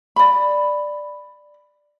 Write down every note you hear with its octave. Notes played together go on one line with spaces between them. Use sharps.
D5 B5